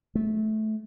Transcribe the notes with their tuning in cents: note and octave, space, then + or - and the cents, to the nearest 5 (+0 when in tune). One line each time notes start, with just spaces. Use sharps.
A3 -20